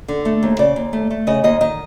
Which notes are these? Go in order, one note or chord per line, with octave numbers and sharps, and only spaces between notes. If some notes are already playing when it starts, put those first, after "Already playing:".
D3
A3
D#2
C#3 D5
D#2
A3
A3
C#3 D#5
D#2 D#5
D#3 D#5